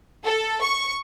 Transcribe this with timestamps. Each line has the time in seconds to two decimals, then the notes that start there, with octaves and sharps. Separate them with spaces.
0.24 A4
0.62 C#6